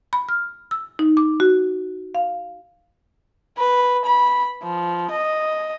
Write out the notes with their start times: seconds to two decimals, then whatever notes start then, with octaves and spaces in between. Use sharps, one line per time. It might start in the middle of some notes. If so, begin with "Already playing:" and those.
0.13 B5
0.29 F6
0.71 E6
0.99 D#4
1.17 D6
1.40 F#4
2.15 F5
3.58 B4
4.05 B5
4.63 F3
5.11 D#5